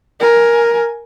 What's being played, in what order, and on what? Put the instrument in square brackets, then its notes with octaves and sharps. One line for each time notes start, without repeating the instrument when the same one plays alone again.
[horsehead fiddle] A#4 G#5